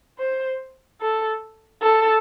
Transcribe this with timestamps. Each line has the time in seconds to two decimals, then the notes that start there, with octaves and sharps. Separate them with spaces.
0.19 C5
1.01 A4
1.82 A4